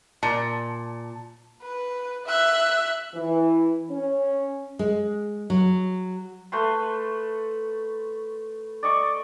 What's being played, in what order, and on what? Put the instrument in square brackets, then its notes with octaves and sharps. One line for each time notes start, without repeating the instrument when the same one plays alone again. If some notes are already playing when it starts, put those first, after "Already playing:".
[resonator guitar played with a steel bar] A#2 [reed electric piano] A5
[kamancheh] B4
E5 F#6
[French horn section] E3
C#4
[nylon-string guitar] G#3
F#3
[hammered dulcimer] A3 B4 C6
D5 D#5 C#6